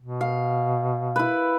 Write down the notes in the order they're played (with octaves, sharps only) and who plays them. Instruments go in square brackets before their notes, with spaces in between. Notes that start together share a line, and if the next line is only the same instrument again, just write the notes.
[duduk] B2
[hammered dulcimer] F5
E4 B4